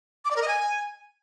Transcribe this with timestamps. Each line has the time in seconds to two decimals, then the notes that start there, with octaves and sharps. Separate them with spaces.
0.25 D6
0.31 D5
0.36 A#4
0.42 D#5
0.48 G#5